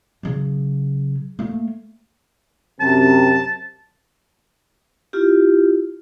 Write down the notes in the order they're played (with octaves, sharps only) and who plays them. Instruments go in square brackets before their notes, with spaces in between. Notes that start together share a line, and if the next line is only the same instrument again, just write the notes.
[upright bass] C#3 F#3
A3 A#3
[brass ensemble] F#2 C3 [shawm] A5
[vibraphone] E4 F4 G4